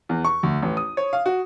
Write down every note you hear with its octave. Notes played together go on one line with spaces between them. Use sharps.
E2
C#6
D2
A1
D#6
C#5
F5
F#4